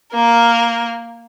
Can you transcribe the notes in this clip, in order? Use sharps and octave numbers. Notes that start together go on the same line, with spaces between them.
A#3 A#4